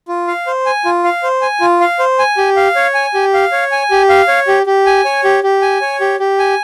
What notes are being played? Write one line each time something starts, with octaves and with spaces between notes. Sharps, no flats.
F4
F5
C5
G#5
F4
F5
C5
G#5
F4
F5
C5
G#5
G4
F5
C#5
G#5
G4
F5
C#5
G#5
G4
F5
C#5
G4
G4
G#5
C#5
G4
G4
G#5
C#5
G4
G4
G#5